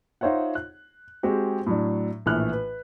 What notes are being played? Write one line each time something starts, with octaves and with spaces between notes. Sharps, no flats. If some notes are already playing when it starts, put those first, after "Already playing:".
D#4 F4 C5 C#5 E5 F#5
F#6
G#3 C4 F#4 G4
A2 F#3 D4
A#1 A2 E3 A3 F6 F#6
B4